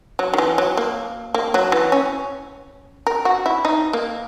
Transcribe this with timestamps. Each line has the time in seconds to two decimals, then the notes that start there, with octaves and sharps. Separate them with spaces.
0.19 F#3
0.34 D#3
0.38 E3
0.58 F#3
0.77 A#3
1.34 A#3
1.54 F#3
1.72 E3
1.92 C#4
3.07 A#4
3.25 F#4
3.46 E4
3.65 D#4
3.93 A#3